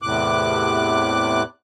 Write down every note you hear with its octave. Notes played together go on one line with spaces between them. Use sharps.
E2 A2 C3 D6 F#6